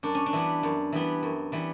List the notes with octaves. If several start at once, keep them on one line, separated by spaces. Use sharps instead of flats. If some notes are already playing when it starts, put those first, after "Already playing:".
F#2 D4
C#4
D4
E3 G3 B3
F#2
E3 G3 B3
F#2
E3 G3 B3